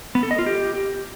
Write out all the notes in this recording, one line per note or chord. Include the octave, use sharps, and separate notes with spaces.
B3
A4
D#5
F4
G4